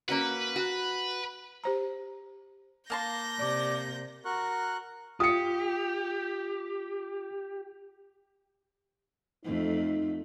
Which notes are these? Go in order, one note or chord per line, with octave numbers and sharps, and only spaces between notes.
A#3 C#4 F#4 B4
F#4
G4 C5 A#5
A#3 A5 C6 G6 A#6
C3 D5
F#4 A#4 C#6 F#6
F4 G4 D#6 C#7
F2 A3 D#4